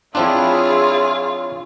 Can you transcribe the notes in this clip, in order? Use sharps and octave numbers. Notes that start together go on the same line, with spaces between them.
F3 C4 D4 E4 F4 G#4 C#5